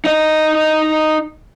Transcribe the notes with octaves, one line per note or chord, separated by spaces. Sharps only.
D#4 D#5